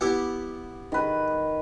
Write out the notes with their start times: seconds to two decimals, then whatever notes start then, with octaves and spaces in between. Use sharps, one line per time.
0.01 B3 E4 G4
0.92 D#3 B4